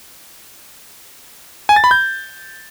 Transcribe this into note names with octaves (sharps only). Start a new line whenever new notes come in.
G#5
A6
B5
G6